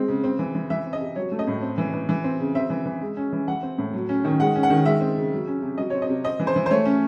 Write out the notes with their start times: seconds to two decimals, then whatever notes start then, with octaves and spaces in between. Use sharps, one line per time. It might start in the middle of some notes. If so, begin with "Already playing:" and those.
Already playing: G#3 C4
0.08 C#3
0.24 C4
0.39 E3
0.55 E3
0.70 E3 E5
0.86 C4
0.93 D#5
1.01 C3
1.16 F#3 C#5
1.32 A3
1.39 D#5
1.47 A2
1.62 C4
1.78 E3
1.93 E3
2.09 E3
2.24 C4
2.40 C#3
2.55 C4 E5
2.70 E3
2.86 E3
3.01 G#3
3.17 C#4
3.32 E3
3.48 E3 F#5
3.63 C4
3.78 A2
3.94 F#3
4.09 C#4
4.25 D#3
4.40 G#3 F#5
4.55 C#4
4.63 F#5
4.70 D#3
4.85 G#3 E5
5.01 C4
5.17 C#3
5.32 F#3
5.47 C#4
5.62 C3
5.78 F#3 D#5
5.90 C4 C#5
6.02 D#5
6.09 C3
6.24 C4 D#5
6.40 E3
6.47 C5
6.56 E3
6.66 C5
6.71 A3 C#5
6.85 C#4